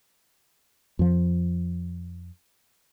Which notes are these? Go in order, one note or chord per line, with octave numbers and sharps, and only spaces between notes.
F2 F3